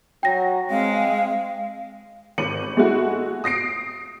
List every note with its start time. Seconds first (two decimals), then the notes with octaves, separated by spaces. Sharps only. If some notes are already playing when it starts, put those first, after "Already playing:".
0.23 F#3 G5 A#6
0.70 G#3 C4 F5
2.38 G#1 C#7 D#7 F#7
2.77 G#3 A3 E4 F#4
3.44 D#6 A#6 C7 D7